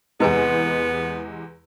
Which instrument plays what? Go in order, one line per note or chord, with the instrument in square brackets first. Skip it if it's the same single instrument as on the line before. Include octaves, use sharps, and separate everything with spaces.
[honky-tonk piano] E2 C3 G#3 [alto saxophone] B3 [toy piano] E4 B4 G#5